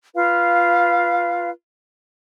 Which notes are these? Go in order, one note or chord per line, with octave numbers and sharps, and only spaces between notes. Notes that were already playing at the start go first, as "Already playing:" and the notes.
F4 B4 F5